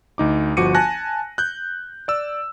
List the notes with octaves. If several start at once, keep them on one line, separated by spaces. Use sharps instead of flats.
D2 D#4 D6
G1 F3 F#4 D6 C#7 D#7
G#5 A5 F#6 A#6
F#6 G6
D5 E6